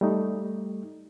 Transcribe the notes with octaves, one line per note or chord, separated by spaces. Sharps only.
G3 A3 D#4